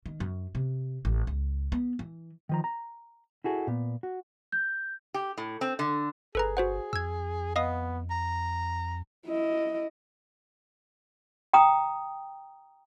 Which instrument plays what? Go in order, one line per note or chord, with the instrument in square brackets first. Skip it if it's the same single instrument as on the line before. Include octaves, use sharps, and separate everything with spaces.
[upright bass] D#3
F#2
C3
A1
C#2
B3
E3
[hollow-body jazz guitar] D#3 F3 A#5
A#5
E4 F#4 G#4 A4
A#2 B3
F#4
[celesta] G6
[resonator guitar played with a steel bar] G4
A2
C4
D3
[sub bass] G1 [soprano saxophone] G#4 [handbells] A4 B4 A#5
[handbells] F#4 C5 F#5
[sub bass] F2 [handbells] E6 G#6
[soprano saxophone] B3 [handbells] D#5 F5 D#6
[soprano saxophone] A#5
[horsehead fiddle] E4 D#5
[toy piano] G5 A#5 D#6